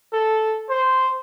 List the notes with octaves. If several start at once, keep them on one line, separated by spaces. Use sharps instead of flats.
A4
C5